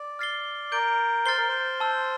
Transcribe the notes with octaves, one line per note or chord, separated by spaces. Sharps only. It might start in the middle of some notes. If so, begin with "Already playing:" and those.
Already playing: D5
F6 A6 C7 G7
A#4 G6 D7 G7
C5 F6 A6 C7 G7
A#4
C5
A5 C6 E6